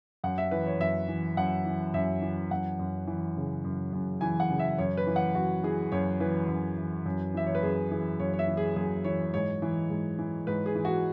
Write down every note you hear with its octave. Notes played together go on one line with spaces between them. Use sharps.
F#2 F#5
E5
E3 B4
C#5
F#2 E5
E3
F#2 F#5
E3
F#2 E5
E3
F#2 F#5
F#2
E3
C#3
F#2
F#2
E3 G#5
F#5
C#3
E5
F#2 C#5
B4
E3
F#5
F#2 F#4
E3 G#4
F#2 C#5
E3 B4
F#2
E3
F#2
E3 E5
C#5
B4
F#2 G#4
E3 G#4
F#2 C#5
C#5
E5
E3
G#4
F#2 G#4
E3 C#5
G#2 C#5
E3
G#2
E3
G#2 B4
G#4
E3
F#4